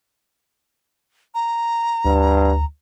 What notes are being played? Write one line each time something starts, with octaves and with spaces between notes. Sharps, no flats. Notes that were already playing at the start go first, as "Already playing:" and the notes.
A#5
D2 G2